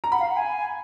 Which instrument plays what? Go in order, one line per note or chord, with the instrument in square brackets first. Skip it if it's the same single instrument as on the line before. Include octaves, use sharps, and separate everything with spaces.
[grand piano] A#5
[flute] F#5 [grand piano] B5
[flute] F5
F#5
G#5